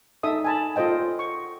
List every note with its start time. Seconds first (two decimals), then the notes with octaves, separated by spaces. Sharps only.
0.23 D#4 A4 E5 D#6
0.44 G#5 A5 B5
0.76 F4 A4 C5 D#5 G5
1.19 C#6